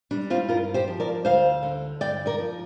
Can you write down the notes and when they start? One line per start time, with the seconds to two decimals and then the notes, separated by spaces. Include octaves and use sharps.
0.11 G3 D4
0.30 C4 F4
0.49 G2 F4 A#4
0.74 G4 C5
0.87 F3
1.00 A#4 D5
1.25 D2 C5 F5
1.63 D3
2.01 G2 D5 G5
2.26 A#4 D5
2.38 F3